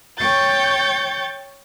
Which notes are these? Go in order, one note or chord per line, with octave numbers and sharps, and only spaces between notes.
C#5 G5 C#6 G6 A6